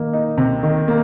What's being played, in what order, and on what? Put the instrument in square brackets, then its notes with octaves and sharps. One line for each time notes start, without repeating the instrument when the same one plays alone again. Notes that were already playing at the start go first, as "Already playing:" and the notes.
Already playing: [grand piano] D#3 A#3
D#4
C3
D#3
A#3